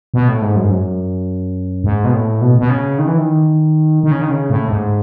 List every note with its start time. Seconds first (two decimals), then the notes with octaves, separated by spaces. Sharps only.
0.14 B2
0.28 A2
0.42 G#2
0.56 F#2
0.64 G#2
0.70 F#2
1.84 G#2
2.05 B2
2.13 A2
2.41 B2
2.59 B2
2.69 C#3
2.98 D#3
3.08 E3
3.18 D#3
4.03 D#3
4.11 C#3
4.21 D#3
4.31 C#3
4.50 A2
4.68 G#2